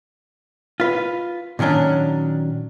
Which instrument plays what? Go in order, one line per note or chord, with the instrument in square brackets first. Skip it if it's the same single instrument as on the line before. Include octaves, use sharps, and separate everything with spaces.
[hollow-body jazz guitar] F4 B4
A#2 D#3 F#3 C#4 D4